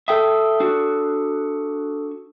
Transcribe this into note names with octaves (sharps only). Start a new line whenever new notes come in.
A4 E5 G5 D#6
D4 F#4